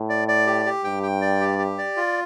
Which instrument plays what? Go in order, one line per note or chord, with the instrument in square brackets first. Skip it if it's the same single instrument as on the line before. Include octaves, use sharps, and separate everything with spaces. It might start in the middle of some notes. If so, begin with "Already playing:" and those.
Already playing: [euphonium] A2
[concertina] D5
D5
G4
G4
[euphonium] G2 [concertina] G5
[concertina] G5
D5
G4
G4
D5
F4